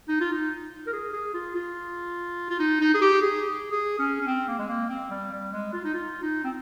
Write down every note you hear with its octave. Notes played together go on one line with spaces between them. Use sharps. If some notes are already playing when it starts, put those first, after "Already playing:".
D#4
F4
D#4
A#4
G#4
G#4
F4
F4
F4
D#4
D#4
G#4
G4
G#4
G#4
C#4
C#4
C4
A#3
G#3
A#3
C4
G3
G3
G#3
F4
D#4
F4
D#4
C4